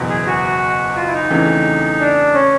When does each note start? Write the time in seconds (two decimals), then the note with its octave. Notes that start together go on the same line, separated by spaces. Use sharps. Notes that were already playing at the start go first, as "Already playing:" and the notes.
Already playing: F#1 E2 B2
0.10 G#4
0.27 F#4
0.96 F4
1.07 E4
1.13 D#4
1.30 E2 C#3 E3 A3 C4
2.00 D4
2.34 C#4